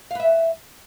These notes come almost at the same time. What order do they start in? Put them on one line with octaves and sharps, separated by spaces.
F5 B4 E5